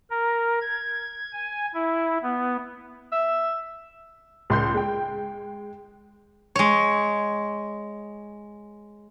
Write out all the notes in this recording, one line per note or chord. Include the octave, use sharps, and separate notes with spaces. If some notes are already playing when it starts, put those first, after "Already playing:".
A#4
G#6
G#5
E4
B3
E5
C#2 C6 G6
G#3 G5
G#3 C#5